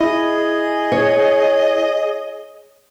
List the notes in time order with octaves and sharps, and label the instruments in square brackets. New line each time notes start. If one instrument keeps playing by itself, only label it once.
[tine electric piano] E4 [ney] G#4 [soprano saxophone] D#5
[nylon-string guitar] C#5